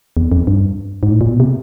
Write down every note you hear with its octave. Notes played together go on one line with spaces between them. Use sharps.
E2
F2
G2
G#2
A2
A#2
B2
C3